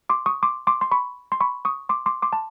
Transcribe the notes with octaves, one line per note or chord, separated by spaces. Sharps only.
C6 D6
C#6 D#6
C6 D6
C6 D6
C6
B5 C#6
C6
B5 C#6
C#6 D#6
C6 D6
C6 D6
C6 D6
A5